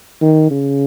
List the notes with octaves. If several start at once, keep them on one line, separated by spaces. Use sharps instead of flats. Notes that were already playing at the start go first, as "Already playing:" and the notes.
D#3
C#3